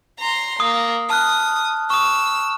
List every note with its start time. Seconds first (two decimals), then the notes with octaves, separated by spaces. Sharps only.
0.19 A#5 C6
0.60 A#3 D#6
1.10 A5 D#6 F6 F#6
1.90 C#6 D#6 E6